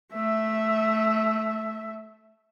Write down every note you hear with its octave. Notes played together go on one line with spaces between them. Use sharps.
A3 E5